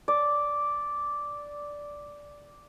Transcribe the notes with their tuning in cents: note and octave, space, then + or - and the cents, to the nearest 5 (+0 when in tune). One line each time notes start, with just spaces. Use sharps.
D5 -5